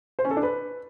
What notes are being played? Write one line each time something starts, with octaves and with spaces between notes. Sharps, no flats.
C5
C#4
A4
D4
B4